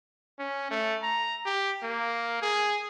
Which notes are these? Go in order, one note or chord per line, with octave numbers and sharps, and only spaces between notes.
C#4
A3
A#5
G4
A#3
G#4